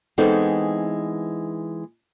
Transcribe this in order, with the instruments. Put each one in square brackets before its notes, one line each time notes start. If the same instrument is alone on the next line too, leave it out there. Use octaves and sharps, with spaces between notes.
[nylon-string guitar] E3 G#3 B3 C4 D#4 A4